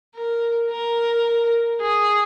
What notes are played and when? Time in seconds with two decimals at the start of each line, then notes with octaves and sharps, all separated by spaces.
0.16 A#4
0.71 A#4
1.81 G#4